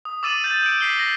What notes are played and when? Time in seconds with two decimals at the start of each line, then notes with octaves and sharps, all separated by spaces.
0.05 D#6
0.23 D6 E6 A6 D#7 E7 F#7
0.44 G6 A6
0.62 E6 D7
0.80 B6 C7 G7
0.99 A#6